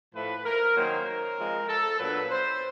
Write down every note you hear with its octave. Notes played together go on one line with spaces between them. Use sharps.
A2 F3 A3 B4
A#4
D#3 F#3 A#3 C#4 C5
A#4
F3 G#3 C4
A4
A#2 F#3 B3 D4 B4
C5